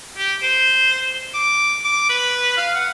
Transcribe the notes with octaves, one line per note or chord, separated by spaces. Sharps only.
G4
C5
D6
D6
B4
F5
F#5